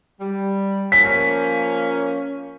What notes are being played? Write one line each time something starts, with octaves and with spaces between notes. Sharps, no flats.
G3
F3 A#3 C#4 B6